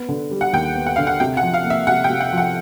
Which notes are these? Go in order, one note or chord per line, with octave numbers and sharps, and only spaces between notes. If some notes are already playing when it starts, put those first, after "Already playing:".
Already playing: B3
D3
G3
F#5
D#2 G5
B3
F#5
D3 F5
F#5
C3 G5
F#5
F3
F5
A#3
E5
C3 F#5
G5
C3
F#5
F3
F#5